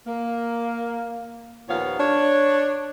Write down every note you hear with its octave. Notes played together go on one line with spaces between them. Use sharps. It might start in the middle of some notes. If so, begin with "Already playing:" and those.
A#3
D#2 A#2 F3 B3 C#5 F5
D4 C#5